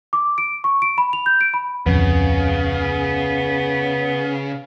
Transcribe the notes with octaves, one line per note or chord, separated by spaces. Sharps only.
D6
D7
C#6
D7
B5
F7
G6
D7
B5
D1 F2 C#3 B3